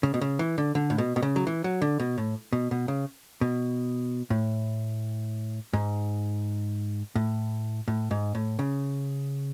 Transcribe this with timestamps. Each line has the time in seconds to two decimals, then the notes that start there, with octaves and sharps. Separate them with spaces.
0.03 C#3
0.14 B2
0.21 C#3
0.39 E3
0.58 D3
0.75 D3
0.90 A2
0.98 B2
1.16 B2
1.22 C#3
1.36 F#3
1.47 E3
1.64 F#3
1.82 D3
1.99 B2
2.18 A2
2.52 B2
2.71 B2
2.88 C#3
3.41 B2
4.30 A2
5.73 G#2
7.15 A2
7.88 A2
8.11 G#2
8.35 A2
8.59 C#3